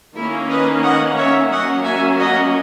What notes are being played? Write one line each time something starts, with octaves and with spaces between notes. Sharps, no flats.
D#3 A#3 C#4 E4
B4 D#5
D#5 F#5
C#5 E5
F#3 A#3 C#4 D#5 F#5
E5 G#5
D#5 F#5